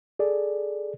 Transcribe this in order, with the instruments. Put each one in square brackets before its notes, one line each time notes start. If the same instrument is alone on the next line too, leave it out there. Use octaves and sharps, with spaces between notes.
[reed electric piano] G#4 A4 D5